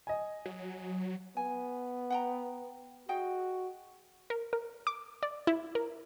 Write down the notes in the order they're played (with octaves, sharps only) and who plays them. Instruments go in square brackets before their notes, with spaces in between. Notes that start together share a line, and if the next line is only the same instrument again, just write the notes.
[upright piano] D#5 G#5
[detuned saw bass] F#3
[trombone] B3 [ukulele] G#5
[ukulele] F#5 G5 A#5
[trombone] F#4 [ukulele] G#4 D#5 G5
[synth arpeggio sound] A#4
A#4
D6
D5
E4
A#4